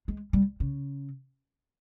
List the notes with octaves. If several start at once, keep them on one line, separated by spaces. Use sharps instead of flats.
G#3
G3
C#3